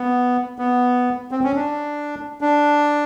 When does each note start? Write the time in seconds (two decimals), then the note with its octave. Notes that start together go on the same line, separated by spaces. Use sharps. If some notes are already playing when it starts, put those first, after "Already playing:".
Already playing: B3
0.59 B3
1.31 C4
1.43 C#4
1.55 D4
2.41 D4